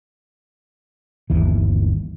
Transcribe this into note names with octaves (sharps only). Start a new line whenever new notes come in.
G1 D#2 E3